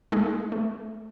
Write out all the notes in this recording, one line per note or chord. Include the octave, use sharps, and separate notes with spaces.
G#3 A#3 D#4 G#4 A4
A3